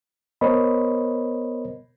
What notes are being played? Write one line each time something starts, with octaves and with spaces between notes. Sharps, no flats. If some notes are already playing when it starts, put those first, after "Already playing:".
B3 A#4 C5 C#5 D#5 B5